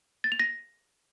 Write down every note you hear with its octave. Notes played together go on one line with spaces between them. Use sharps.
A6
F7
A#6